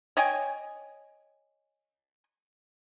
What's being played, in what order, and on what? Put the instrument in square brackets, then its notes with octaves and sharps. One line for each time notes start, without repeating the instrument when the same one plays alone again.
[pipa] C#5 D#5 G5 G#5